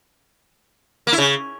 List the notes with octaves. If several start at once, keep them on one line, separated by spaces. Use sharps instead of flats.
A#3
E4
C#3